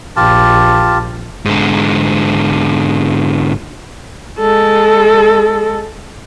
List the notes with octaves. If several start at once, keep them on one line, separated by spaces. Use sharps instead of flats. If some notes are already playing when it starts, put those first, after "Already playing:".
A#1 F4 G4 A5
G#2 D3
G#3 A4